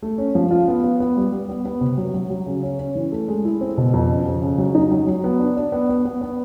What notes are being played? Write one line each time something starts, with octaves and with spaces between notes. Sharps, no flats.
A3
C#4
F3
F4
B3
B3
B3
G3
G3
B3
B3
C3
F#3
F#3
F#3
C#3
C#4
C#4
E3
A3
G#3
E4
C4
B2
F2
C#3
F2
C#3
F#3
D#4
F#3
F#3
B3
D4
D4
B3
B3
B3
B3